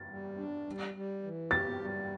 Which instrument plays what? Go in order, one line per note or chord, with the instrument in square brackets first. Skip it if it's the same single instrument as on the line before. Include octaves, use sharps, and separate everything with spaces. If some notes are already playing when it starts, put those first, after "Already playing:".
Already playing: [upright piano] A6
[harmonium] G3
D4
G3
G3
E3
[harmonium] G4 [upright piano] A6
[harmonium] G3